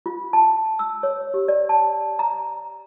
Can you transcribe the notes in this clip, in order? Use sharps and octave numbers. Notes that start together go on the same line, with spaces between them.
F4
A5
E6
C#5
G4
D5
A5
A#5